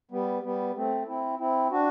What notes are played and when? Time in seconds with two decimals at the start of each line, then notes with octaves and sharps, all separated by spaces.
0.11 G3 B3
0.43 G3 B3
0.75 A3 C4
1.07 C4 E4
1.39 C4 E4
1.71 D4 F#4